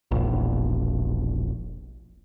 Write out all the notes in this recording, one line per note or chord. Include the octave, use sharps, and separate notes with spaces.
E1 A#1